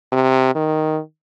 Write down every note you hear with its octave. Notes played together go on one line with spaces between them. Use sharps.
C3
D#3